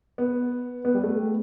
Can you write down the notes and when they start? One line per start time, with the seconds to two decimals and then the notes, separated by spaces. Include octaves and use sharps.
0.18 B3
0.85 B3
0.94 G3
1.03 A3